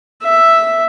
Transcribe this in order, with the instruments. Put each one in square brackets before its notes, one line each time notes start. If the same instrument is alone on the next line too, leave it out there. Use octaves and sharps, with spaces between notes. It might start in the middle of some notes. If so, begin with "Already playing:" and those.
[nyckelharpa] E5